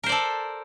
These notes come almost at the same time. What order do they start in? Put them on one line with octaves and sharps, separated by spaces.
A#4 C5 D5 A4